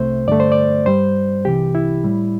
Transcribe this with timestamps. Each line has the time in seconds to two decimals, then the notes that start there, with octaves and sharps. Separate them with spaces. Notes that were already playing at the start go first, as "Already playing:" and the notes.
Already playing: C2 C3 A3 C5
0.27 G2 D3 A3 D5
0.40 C5
0.52 D5
0.86 G2 G3 C5
1.45 C2 C3 E3 G4
1.75 E4
2.04 A2 G3